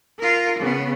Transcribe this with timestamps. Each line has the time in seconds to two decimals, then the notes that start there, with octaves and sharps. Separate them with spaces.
0.19 F4 A#4
0.59 C#3 B3